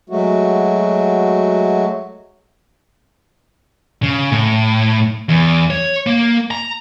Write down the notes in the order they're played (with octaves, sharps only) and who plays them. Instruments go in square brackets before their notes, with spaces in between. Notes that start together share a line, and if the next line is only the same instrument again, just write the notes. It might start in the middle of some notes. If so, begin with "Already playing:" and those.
[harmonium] F#3 G#3 A3 F#4
[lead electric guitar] C#3
A2
E2
C#5
A#3
A#5